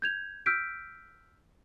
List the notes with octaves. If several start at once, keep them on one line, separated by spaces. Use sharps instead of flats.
G6 G#6 F7
E6 F6 G6 B6 D7